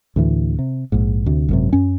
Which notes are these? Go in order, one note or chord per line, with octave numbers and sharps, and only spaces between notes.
D2 A2 E3
C3
A#1 G#2
D2 C3
G#1 F#2 C3
F#2 C#4